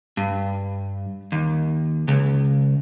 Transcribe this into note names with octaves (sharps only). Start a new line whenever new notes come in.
G2
D#2
C#2